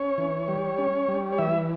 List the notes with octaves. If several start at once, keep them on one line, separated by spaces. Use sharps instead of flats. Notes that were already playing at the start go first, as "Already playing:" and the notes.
Already playing: C#4 C#5
E3
G3
C#4
G3
C#5
E3 E5